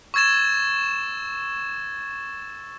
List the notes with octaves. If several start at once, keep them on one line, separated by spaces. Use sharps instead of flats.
C#6 E6 G#6 A6 E7